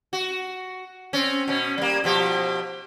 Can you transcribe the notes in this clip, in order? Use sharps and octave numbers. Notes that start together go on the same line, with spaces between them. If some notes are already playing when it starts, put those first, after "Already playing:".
F#4
C4 C#4
B2 C#4
G3 A#3
B2 F3 G4